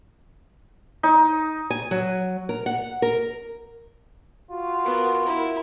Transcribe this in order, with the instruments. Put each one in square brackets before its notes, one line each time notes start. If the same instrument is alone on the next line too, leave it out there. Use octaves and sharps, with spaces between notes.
[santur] D#4
[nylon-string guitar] G#5
F#3
A#4
F#5
A#4
[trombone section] F4 F#4
[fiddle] B3 A#4
E4 A#4